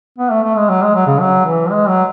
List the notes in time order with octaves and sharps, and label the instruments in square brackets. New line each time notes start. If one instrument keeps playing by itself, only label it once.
[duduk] B3
A3
A3
G#3
F#3
G#3
F#3
C#3
F#3
E3
G#3
F#3